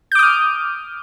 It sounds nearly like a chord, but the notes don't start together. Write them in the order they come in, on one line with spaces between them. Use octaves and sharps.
G6 D6 D#6 F6